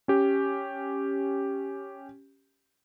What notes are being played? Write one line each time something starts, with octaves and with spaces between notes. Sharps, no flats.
C#4 G4